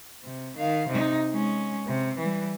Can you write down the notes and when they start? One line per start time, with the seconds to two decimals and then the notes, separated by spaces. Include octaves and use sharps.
0.24 C3
0.57 D#3 F5
0.88 C3 D#4
1.31 G#3 C#4
1.88 C3
2.18 E3 G3